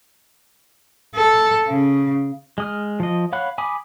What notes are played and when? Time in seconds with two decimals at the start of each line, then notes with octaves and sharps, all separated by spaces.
1.15 A4
1.68 C#3
2.58 G#3 D#6 F6
3.00 F3 D#5
3.32 C#5 F5 F#5 B5 F#6
3.58 G#5 B5 D6 D#6